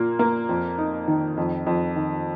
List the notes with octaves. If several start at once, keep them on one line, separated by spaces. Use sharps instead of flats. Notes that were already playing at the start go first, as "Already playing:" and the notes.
Already playing: A#2 A#3
A#3
F2
D#4
D#3
F2
F2
D#3